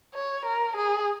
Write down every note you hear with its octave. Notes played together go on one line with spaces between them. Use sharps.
C#5
A#4
G#4